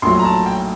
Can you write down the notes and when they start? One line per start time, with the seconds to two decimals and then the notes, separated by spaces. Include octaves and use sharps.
0.02 A#1 A2 F#3 C6
0.19 A#5
0.25 A5
0.46 G5